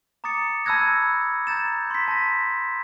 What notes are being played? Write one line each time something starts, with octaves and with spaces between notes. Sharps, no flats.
A#5 D6 D#6 A6 C#7
A5 B5 E6 F#6 G#6 A#6
A#5 G6 A6 E7
C6 B6
A5 A#6